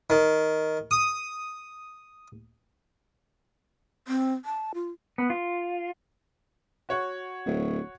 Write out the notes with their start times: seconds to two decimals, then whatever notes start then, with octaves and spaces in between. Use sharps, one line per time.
0.10 D#3
0.91 D#6
4.08 C4
4.45 A5
4.74 F4
5.18 B3
5.30 F4
6.89 F#4 C#5 F#5
7.45 D1